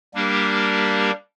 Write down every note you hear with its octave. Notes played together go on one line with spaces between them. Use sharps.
G3 A#3 D4 G4 A#4